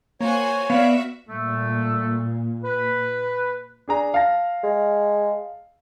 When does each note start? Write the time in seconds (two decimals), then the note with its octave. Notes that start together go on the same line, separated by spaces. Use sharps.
0.20 A#3 F#4 C5 C#5 G#5
0.70 B3 F#4 D5 E5 F5
1.28 A#2 G3 A3
2.64 B4
3.88 D4 G#4 A#5
4.14 F5 A5 A#6
4.63 G#3